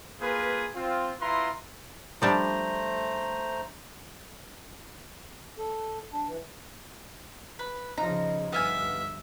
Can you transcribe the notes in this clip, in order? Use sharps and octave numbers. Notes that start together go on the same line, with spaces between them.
A#3 F4 G#4 B4
C4 F4
E4 F4 B4 A#5 C6
F3 G3 A3 D4 C5 A#5
A4
D4
E3
B4
C#3 F3 D#4 A#5
G1 B3 E5 F5 G#5